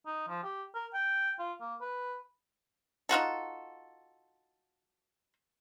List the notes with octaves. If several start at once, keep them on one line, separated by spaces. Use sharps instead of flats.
D#4
F3
G4
A#4
G5
F4
A#3
B4
D#4 F4 F#4 A4